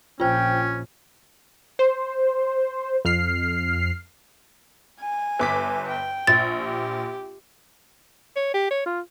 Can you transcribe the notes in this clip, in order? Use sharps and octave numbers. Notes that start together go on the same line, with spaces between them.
A#1 C#4 F4 C5 G5
C5
F2 F6 C7
G#5
G1 D6 B6
G5
A#1 A6
G4
C#5
G4
C#5
F4